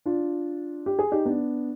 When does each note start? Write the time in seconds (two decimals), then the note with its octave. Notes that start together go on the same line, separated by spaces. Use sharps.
0.06 D4 F4
0.86 G4
0.99 G#4
1.12 D#4 G4
1.25 B3 D4